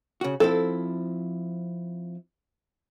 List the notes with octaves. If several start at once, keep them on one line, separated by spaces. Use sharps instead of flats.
C#3 F#4
F3 C4 E4 A4